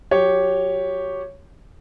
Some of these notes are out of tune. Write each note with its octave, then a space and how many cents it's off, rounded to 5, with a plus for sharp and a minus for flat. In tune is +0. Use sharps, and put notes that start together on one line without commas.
F#3 -25 G4 +0 C#5 +0